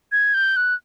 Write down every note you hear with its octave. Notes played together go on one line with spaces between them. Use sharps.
G#6
G6
F#6